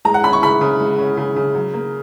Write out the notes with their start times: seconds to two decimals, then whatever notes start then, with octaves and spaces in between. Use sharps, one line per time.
0.05 G#3 A#5
0.14 F#5
0.24 C#4 B5
0.33 C#6
0.42 C#3 B5
0.61 C#3
0.80 G#3
0.99 C#4
1.17 C#3
1.36 C#3
1.55 F#3
1.74 A#3